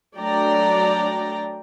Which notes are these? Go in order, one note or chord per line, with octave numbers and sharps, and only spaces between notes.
F#3 A3 D4 D5 G5 A#5